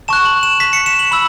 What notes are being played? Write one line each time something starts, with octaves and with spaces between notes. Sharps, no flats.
A5 C#6 F#6 E7
F#7
E7
B6
C#7
E7
F#7
B5 E6 F#7